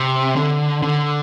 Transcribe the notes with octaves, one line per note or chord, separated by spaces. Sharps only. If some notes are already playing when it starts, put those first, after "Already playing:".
Already playing: C3
D3
D3